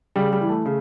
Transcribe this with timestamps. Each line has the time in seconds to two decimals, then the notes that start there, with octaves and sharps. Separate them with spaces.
0.16 C#3 G3
0.33 G3
0.41 E3
0.49 A3
0.65 C#3